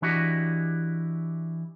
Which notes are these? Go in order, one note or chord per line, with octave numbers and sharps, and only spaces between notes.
E3 D4 E4 F#4 G4 D#5